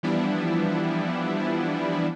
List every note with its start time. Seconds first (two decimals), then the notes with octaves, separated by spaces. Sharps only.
0.03 E3 F3 G3 B3 D4 E4